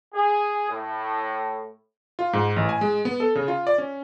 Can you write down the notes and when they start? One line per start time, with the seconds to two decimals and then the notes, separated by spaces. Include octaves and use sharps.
0.13 G#4
0.69 A2
2.19 F4
2.33 G#2
2.56 A1
2.69 G#5
2.81 G#3
3.05 B3
3.20 A4
3.35 C#3
3.48 F4
3.67 D5
3.78 C#4